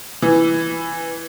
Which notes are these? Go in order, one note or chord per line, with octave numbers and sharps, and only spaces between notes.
E3